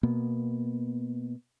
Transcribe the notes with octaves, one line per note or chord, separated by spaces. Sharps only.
B2 A#3 B3